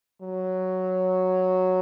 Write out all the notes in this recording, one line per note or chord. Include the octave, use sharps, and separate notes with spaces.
F#3